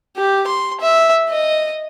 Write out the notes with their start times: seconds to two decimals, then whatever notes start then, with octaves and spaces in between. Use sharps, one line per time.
0.17 G4
0.47 C6
0.81 E5
1.30 D#5